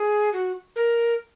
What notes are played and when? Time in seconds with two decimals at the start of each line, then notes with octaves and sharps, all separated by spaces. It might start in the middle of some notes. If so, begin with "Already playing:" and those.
Already playing: G#4
0.33 F#4
0.76 A#4